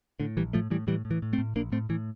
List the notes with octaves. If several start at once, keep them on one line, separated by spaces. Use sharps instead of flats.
A2 D3
A#1 E3 G3
A2 F3 A3
A2 E3 G3
A2 E3 G3
A2
E3
A2
A3 C4
A2
A#1 A#3 D4
A2 A3 C4
A2 E3